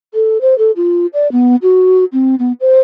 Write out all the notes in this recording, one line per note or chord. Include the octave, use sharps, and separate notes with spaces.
A4
C5
A4
F4
D5
B3
F#4
C4
B3
C5